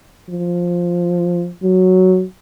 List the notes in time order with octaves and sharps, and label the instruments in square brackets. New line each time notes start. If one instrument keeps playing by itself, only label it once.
[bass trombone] F3
F#3